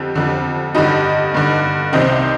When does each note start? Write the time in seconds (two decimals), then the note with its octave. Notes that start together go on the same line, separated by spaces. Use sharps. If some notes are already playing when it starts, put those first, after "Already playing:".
Already playing: F2 D3 G4
0.15 F2 D3
0.75 G2 D3 D#4 G4
1.34 G2 D3
1.93 C2 C3 D#3 C4 D#4